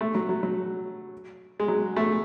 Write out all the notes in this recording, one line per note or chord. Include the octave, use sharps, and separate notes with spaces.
A3
F#3
F#3
F#3
G#3
F#3
A3